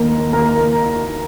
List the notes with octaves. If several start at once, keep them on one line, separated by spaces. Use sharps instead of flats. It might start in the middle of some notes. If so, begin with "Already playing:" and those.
Already playing: D#2 A#4 D#5 A#5
D#2 A#4 A#5